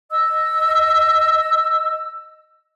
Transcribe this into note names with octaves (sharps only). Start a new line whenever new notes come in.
D#5 E6